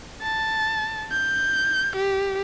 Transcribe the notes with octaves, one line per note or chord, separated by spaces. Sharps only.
A5
G6
G4